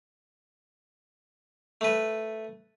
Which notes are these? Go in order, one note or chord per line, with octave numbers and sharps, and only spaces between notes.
A3 B4